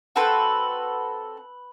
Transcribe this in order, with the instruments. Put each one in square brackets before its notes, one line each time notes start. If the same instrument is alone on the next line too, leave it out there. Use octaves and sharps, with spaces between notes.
[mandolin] C4 F#4 A4 B4